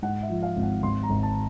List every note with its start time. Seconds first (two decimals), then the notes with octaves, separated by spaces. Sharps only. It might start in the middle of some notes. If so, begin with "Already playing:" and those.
0.02 G#2 F#5
0.23 E5
0.29 F3
0.43 F5
0.57 G#1
0.63 F#5
0.83 G#1 C6
1.03 A#5
1.10 G#1
1.23 A5